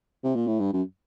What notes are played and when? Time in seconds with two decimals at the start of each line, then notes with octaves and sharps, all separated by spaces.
0.23 C3
0.36 A#2
0.47 A2
0.60 G2
0.73 F#2